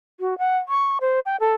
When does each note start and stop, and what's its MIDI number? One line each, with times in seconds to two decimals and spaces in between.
0.20 0.37 66
0.38 0.58 78
0.68 0.98 85
1.01 1.20 72
1.26 1.36 79
1.40 1.55 69